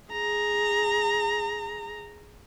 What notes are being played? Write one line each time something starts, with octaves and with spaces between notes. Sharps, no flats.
G#4 A#5